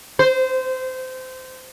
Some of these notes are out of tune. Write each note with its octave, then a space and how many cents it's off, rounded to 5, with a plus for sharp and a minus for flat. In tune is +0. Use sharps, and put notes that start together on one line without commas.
C5 -20